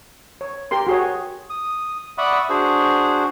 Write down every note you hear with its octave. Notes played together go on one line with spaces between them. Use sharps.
C#5
G4 A#4 C6
F#4 G#4 C#5
D#6
D5 E5 F#5 B5 C#6 D#6
D4 F#4 G#4 C5